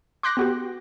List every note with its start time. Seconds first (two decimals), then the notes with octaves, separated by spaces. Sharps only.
0.23 C6 D6 F#6 G6 A#6
0.37 B3 F#4 G4